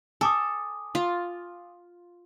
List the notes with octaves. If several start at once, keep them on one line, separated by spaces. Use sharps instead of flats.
A4 G#5 D6 D#6
F4